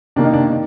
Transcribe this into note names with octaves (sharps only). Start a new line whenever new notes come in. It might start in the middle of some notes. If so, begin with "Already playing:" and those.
C3 D#3 A#3 D4
D#4
D4
D#3